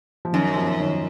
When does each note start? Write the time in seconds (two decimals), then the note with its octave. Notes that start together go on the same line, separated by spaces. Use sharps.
0.25 F3
0.33 F#2 D#3
0.56 F3
0.80 D#3